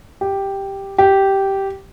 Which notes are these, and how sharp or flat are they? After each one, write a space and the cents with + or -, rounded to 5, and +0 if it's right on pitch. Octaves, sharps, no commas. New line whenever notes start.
G4 +0
G4 -10